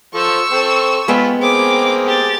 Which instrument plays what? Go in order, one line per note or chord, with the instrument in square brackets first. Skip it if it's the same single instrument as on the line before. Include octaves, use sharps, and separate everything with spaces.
[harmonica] F3 A4 C5 [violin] C#6 E6
[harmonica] C4 A4
[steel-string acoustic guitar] G#3 B3 G5 [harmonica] F4 B5
[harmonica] A#3 C4 G#4 [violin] D6
[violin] G4 A6